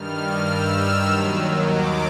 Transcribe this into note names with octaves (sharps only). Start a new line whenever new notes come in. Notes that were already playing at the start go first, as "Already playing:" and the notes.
Already playing: G2 D#3 G3 F6
E6
D#2 D#3 F#3
D6